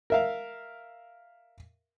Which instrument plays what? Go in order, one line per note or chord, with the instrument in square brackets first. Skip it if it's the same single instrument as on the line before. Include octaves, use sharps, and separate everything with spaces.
[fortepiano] A#4 E5 F5